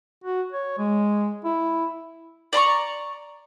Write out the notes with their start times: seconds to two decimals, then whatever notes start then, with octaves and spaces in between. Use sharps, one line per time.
0.24 F#4
0.52 C#5
0.78 G#3
1.44 E4
2.53 D5 A#5 C6 C#6